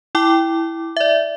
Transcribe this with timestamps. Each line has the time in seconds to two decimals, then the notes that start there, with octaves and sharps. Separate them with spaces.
0.15 E4 G5 D6
0.97 D5 E5